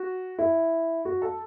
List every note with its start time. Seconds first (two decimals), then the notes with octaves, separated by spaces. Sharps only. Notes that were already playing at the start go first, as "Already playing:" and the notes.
Already playing: F#4
0.39 E4
1.05 F#4
1.22 A4